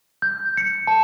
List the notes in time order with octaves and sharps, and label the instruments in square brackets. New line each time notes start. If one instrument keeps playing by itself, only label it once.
[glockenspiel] G6
C#7
A5